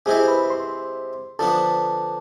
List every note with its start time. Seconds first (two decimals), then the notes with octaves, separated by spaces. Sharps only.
0.06 C3 G#3 C4 E4 G#4 G#5
0.28 B4 B5
0.50 C5 C6
1.39 D3 F3 B3 A4 A5